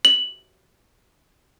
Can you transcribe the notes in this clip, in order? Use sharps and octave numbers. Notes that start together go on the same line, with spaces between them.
F#7